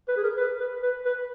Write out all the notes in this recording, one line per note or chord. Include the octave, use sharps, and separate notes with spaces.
B4
G#4
A#4
B4
B4
B4
B4